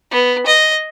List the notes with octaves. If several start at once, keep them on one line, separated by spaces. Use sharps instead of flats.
B3
D#5